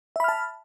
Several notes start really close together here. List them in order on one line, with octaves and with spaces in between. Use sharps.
E5 B5 F6 A5